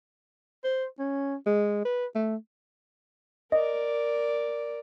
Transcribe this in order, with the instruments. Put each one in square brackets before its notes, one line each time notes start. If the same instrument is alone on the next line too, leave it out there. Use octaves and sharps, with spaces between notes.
[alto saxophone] C5
C#4
G#3
B4
A3
[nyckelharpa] A#4 D5 [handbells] D#5